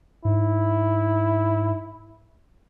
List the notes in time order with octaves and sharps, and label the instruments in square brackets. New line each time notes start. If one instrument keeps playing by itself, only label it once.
[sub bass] G#2 [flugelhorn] E4